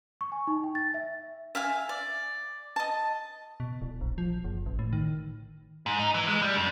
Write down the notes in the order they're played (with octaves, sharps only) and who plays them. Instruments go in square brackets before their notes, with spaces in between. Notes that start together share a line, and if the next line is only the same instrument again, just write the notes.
[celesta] C#6
G#5
D#4
G5
A6
E5
[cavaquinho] E5 F5 G5 G#5
D5
D#5 A5
[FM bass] B2
D1
A#1
F3
F#1
A1
A2
D#3
[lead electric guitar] G#2
D#4
E3
G#3
G3
F2